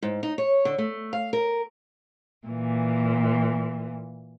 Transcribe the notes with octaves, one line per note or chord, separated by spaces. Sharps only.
G#2
D#4
C#5
D3
A3
F5
A#4
A#2 E3